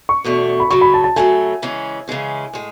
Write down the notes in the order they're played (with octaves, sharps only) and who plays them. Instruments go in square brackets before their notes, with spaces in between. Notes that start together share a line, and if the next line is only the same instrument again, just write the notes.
[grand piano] C#6
[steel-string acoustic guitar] E2 B2 A3 D4
[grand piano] B5
[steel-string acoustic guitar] F#2 C#3 F#3 A3 [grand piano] C#6
[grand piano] B5
A5
A5
[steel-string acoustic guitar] F#2 C#3 F#3 A3 [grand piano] G#5
[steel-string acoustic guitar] C#3 E3 G#3 C#4
C#3 E3 G#3 C#4
A2 G#3